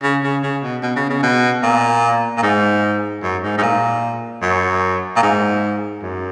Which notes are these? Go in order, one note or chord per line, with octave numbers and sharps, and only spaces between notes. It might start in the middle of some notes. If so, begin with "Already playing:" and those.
C#3
C#3
C#3
B2
B2
C#3
C#3
B2
A#2
A#2
G#2
F#2
G#2
G#2
A#2
F#2
A#2
G#2
F#2